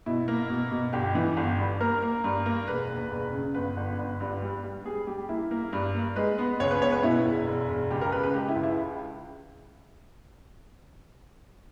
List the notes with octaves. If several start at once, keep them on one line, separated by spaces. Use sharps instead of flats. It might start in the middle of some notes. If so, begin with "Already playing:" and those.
B2 E4
A#3
B2
B2
G1 G4
E3
G1
G2
A#3 A#4
A#3
G2
A#3
E1 B4
D#2
E1
C#3
G1 B4
G1
G1
G2
G3
G3
G3 G#4
G3 G4
A#3 E4
A#3
G2
A#3
G#3 B4
B3
C#2 C#5
B4
B3 C#5
B4
B2 E4
E1
E1
E1
C#2 G4
A#4
C#3 B4
B4
G#3 G4
E4
C#2
E4